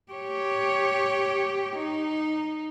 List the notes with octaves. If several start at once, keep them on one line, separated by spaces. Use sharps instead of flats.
G4 C#5
D#4